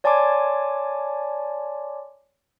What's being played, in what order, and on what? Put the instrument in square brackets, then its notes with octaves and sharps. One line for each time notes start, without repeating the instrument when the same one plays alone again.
[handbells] C#5 D5 G#5 A5 C6 D6